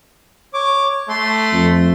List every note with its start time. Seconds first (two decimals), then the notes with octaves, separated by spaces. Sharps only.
0.54 C#5 D6
1.09 A3 C6
1.52 F2